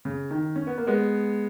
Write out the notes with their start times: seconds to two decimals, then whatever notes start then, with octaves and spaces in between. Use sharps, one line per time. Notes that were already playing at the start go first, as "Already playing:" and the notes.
0.05 C#3
0.31 D#3
0.56 C#4
0.67 B3
0.78 A#3
0.87 G#3 B3